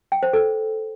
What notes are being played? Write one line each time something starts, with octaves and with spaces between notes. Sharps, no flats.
G5
C5
A4